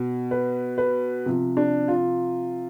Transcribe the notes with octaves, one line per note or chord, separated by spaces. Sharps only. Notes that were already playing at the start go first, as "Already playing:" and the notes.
Already playing: B2
B4
B4
C3 F3
D4
F4